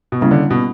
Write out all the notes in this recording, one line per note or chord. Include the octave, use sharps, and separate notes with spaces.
B2
C#3 G3 A#3 C#4 E4
D3
B2